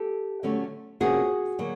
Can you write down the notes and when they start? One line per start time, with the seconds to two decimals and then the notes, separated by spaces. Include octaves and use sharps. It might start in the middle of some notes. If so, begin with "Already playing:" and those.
Already playing: G4 A4
0.43 D3 F#3 A3 C#4
1.00 C3 F3 A#3 C#4 F#4 G#4
1.58 D3 F#3 A#3